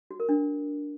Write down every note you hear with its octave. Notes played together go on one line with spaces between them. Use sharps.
F#4
A#4
D4